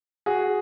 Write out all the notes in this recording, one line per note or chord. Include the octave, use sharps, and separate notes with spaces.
F#4 G#4